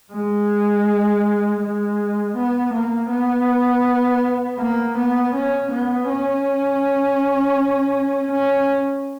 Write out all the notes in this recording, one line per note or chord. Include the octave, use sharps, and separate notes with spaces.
G#3
G#3
B3
A#3
B3
A#3
B3
C#4
B3
C#4
C#4